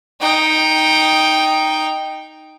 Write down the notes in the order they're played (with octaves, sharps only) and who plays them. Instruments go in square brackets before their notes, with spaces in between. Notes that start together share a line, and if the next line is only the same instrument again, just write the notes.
[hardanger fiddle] D#4 G5